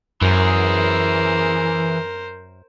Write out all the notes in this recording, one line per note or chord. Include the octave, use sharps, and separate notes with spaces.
F#2 E3 G#4 A#4 C5